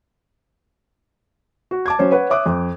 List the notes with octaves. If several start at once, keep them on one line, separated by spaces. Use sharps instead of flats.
F#4
A5 D6 G#6
F#3 C#4 C5
B4 C#5 F#5
C#5 E5 D6 D#6 F#6
F2